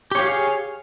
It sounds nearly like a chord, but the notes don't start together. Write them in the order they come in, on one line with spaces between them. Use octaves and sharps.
G4 C#5 F5 G#4